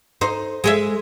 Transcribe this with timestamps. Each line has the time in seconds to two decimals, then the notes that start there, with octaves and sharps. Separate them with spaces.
0.21 D#4 C5
0.64 G#3 G#4 E5